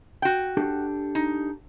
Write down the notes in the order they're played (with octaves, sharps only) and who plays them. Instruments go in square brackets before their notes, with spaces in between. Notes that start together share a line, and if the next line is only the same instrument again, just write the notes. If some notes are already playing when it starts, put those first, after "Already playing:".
[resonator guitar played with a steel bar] F#4 G5
[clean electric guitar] D4 G4 A4
[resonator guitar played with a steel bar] D#4